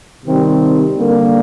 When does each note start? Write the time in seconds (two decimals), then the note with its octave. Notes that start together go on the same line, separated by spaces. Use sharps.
0.25 C3 D#3 G3 C4
0.98 D3 G3 A#3